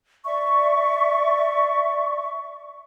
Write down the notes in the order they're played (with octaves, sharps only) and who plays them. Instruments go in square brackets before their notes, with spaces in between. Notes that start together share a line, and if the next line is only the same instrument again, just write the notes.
[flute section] D5 E5 C#6